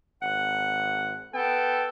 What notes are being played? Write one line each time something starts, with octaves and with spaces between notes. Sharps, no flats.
G#1 F#5
B3 A4 G5